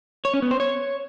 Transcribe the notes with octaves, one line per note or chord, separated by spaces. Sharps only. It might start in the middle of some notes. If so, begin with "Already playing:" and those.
C#5
C#4
B3
C5
C#5